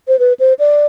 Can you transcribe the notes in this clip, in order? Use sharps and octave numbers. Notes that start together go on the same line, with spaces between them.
C5
B4
C5
D5